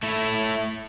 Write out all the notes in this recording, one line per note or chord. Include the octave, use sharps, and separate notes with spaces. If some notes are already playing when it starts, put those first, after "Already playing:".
A3 E4